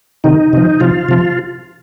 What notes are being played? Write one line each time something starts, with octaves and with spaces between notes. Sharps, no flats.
C3 D#3 D#4
C3 F3
C3 F3 F4
C3 F3